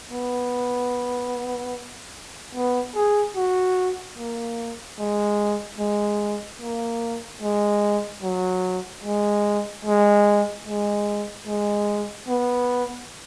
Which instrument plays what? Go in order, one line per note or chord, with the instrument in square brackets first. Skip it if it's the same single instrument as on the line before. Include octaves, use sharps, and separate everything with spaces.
[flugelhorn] B3
B3
G#4
F#4
A#3
G#3
G#3
A#3
G#3
F#3
G#3
G#3
G#3
G#3
B3